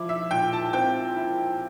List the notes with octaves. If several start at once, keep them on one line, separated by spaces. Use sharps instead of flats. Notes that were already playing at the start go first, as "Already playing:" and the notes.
Already playing: F3 E4 D6
E5
A#2 G5
A5
C4 G5
E4